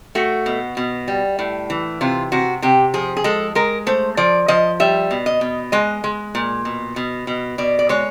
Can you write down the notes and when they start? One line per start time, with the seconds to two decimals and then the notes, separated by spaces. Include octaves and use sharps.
0.15 A3 F#4
0.46 B2
0.77 B2
1.08 G3
1.39 A2
1.70 E3
2.01 C3 F4
2.32 C3 F#4
2.62 C3 G4
2.94 F3 G#4
3.17 G#4
3.24 G#3 A4
3.55 G#3 A#4
3.87 A3 C5
4.17 F3 D5
4.48 F3 D#5
4.80 G3 E5
5.11 B2
5.26 D#5
5.41 B2
5.72 G#3 D#5
6.04 G#3
6.35 A#2
6.65 B2
6.96 B2
7.27 B2
7.58 B2 D5
7.79 D5
7.89 G#3 C#5